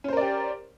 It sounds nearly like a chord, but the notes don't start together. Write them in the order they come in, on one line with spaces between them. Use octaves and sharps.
C#4 C5 A#4 D5 G4